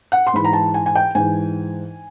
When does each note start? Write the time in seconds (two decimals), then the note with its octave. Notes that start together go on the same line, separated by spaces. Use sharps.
0.12 F#5
0.27 C6
0.34 G#2 E3 B5
0.45 A#5
0.53 A5
0.74 G#5
0.86 G#5
0.95 G5
1.15 G#2 E3 G#5